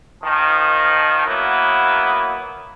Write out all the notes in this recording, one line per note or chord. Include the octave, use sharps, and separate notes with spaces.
D#3 F3
F#3 A#3 B3 E4